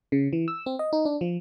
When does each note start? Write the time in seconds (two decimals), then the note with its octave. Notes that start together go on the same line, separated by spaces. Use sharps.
0.12 C#3
0.33 E3
0.48 E6
0.66 C4
0.79 D#5
0.93 D#4
1.05 D4
1.21 F3